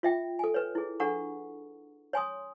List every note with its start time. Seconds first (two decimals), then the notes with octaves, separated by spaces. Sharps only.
0.03 F4 E5 G5
0.39 A4 G#5
0.54 B4 C#5
0.75 E4 G#4
1.00 D4 A4 F#5 A#5 C#6
2.13 C#5 G#5 C6 D#6